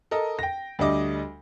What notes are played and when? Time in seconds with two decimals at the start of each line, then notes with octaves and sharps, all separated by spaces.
0.11 A4 A#4 D#5
0.39 G5 A#6
0.79 D2 G3 D4 D#5 D6